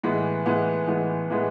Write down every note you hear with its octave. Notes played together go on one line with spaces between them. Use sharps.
A2 E3 G#3 B3
A2 E3 G#3 B3
A2 E3 G#3 B3
A2 E3 G#3 B3